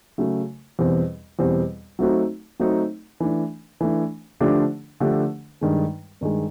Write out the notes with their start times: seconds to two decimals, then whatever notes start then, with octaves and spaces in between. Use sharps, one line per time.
0.18 C#3 F#3 A3
0.79 E2 B2 G3 C4
1.39 E2 B2 G3 C4
1.99 F#3 A3 C4 D#4 F#4
2.59 F#3 A3 C4 D#4 F#4
3.20 E3 A3 D4
3.81 E3 A3 D4
4.40 D3 F3 A3 D4 G4
5.00 D3 F3 A3 D4 G4
5.61 G2 D#3 G#3
6.21 G2 D#3 G#3